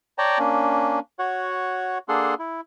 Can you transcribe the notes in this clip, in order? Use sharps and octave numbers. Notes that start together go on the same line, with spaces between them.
C#5 D5 G5 A5 A#5
A#3 C#4 D4
F#4 C#5 F#5
A#3 D4 G#4 A4 F#5 C6
E4